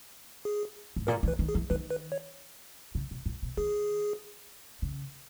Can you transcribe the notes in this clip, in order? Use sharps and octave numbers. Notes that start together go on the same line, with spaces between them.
G#4
G#2
A#2 A#4
E3
B4
D#3
G#4
E3
D#3 B4
B4
C#5
C#3
B2
A#2
B2
D#3 G#4
C#3